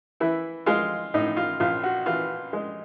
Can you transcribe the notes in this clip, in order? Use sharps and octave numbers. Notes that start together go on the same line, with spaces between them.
E3 E4
G#3 F4
A2 D#4
F4
A#1 F4
F#4
E3 F4
G#3